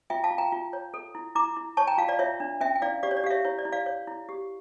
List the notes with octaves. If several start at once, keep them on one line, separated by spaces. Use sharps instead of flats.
F4 E5 G5
F5 A5
F4
G5 A#5
F4
C#5
A4
E4
E4 A#5 D6
E4
C#5 A5 C#6
G5 A#5
F4 F5 A5
D5 F5
F4 C#5 E5
D4
C#4 E5 G5
G5
E4 D5 F5
G4 D5 F5
C#5
D5
G4 F5
C#5 E5
E4 C#5
D5
E4
D5 F5
C#5
E4
G4